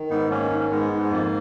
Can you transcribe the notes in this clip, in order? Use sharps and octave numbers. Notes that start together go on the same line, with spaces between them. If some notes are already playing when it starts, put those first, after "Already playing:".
Already playing: D#3
G#2 B3 D#4
D#3 A#3 C#4
G#2
C#4
G#2 G#3 B3
G#2
G#3
F2 A#3